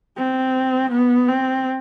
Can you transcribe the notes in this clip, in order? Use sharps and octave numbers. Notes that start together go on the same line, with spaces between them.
C4
B3
C4